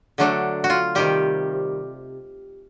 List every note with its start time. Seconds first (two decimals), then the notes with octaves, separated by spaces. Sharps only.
0.18 D3 F#3 A3 D4
0.64 F#4
0.70 F4
0.95 C3 D#3 G3 G4